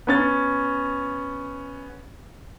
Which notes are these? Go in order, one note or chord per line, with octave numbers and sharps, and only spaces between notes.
B3 C#4 A6